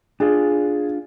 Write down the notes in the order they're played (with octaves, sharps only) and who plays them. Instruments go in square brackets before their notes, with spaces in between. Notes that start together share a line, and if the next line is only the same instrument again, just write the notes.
[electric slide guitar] D4 F4 [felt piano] G#4